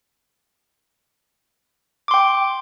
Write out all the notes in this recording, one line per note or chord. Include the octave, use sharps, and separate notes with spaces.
G5 C6 D6